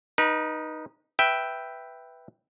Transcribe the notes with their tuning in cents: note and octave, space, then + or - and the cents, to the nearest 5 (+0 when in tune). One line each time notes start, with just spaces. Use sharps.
D#4 -5 B4 -35
B4 +0 E5 +0 G5 +0